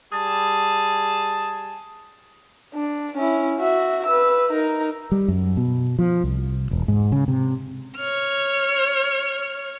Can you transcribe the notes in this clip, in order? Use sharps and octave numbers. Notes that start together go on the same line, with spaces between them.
G3 G#4 A5
D4
C#4 E4
F#4 E5
B4 E6
D#4 A#4
G3
F#2
B2
F3
C2
E1
G#2
C#3
C3
C#5 F6